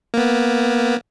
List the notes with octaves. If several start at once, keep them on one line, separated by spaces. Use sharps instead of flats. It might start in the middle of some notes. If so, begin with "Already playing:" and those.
A#3 B3